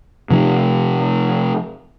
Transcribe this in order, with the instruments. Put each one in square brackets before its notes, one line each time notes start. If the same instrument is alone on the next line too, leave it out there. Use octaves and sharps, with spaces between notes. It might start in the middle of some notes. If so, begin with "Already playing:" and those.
[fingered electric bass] C3 F3 A3